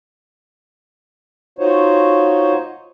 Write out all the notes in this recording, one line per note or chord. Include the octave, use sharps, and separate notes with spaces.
D#4 F4 F#4 C5 C#5